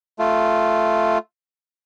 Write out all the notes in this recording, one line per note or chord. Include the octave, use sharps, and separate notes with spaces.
A3 F4